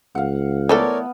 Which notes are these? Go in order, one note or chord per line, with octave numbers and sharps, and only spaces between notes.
C#2 F5 F#5
E3 A3 B3 A4 A#4 C#5 D5